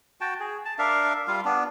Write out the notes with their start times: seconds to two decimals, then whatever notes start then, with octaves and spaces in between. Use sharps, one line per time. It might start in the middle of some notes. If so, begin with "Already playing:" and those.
0.21 F#4 G5 A5
0.40 G#4
0.65 A5
0.79 D4 A#4 E5 F5
1.27 G3 F4 F5
1.45 B3 D4